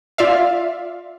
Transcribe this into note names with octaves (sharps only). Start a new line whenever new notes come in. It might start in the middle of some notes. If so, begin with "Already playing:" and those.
F4 D5 E5 F5